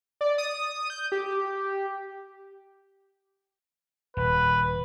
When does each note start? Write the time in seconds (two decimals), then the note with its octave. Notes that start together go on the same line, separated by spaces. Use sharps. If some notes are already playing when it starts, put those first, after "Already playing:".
0.21 D5
0.38 D#6
0.90 G6
1.12 G4
4.17 D#1 B4